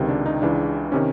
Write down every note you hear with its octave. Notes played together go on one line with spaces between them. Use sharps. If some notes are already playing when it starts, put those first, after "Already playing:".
Already playing: C#2 C3 D#3
D4
D#4
C#2 C#3 E3 D4
C3 D#3 C#4